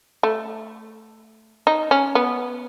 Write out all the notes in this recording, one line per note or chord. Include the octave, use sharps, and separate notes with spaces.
A3
D#4
C#4
B3